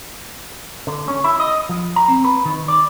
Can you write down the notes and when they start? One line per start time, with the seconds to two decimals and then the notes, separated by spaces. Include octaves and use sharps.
0.87 D3
1.08 C#4
1.24 E4
1.40 D#5
1.69 F3
1.96 A#5
2.08 C4
2.25 B4
2.45 D#3
2.68 D5